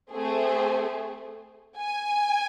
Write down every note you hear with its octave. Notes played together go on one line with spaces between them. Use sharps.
A3 C4 G#4
G#5